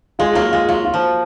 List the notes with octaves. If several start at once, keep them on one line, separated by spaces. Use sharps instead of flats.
G#3 F4
F#3 A#3 F4
G#3 F4
F#3 F4
F4
F3